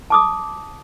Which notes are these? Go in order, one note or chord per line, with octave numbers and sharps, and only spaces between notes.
A5 D6 D#6